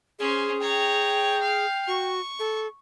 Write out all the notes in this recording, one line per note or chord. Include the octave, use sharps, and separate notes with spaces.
C#4 G#4 C5
C#5 G5 A#5
F5
F#4 C#6
A4